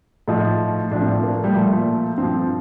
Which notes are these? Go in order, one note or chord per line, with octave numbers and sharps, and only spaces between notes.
A2 F3 D#4
A2 F3 D4
C4
A#3
A3
G3
A#2 F3 A3
G2 F3 C4